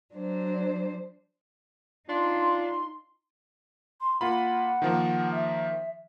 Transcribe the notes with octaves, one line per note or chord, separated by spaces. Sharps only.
F#3 D4 C5
D4 D#4 F4 C6
C6
A#3 F4 F#5 B5
D#3 F3 A#3
E5